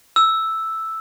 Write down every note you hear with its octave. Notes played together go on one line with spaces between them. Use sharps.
E6